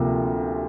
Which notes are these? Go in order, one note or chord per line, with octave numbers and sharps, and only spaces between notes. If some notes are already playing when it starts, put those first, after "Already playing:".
Already playing: D2 C3 F3 A#3